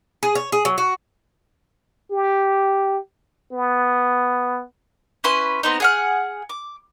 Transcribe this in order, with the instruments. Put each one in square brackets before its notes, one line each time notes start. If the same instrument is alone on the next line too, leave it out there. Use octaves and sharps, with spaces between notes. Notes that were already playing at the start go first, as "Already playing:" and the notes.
[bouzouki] G#4
C#5
G#4
F#3
F#4
[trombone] G4
B3
[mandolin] C#4 E4 B4 C6
B3 C4 D#4
G#4 F#5 F6
D6